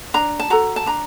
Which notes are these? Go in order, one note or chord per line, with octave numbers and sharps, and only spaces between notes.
D4 A#5
A5
F#4 A4 A#5
A5
D4 A#5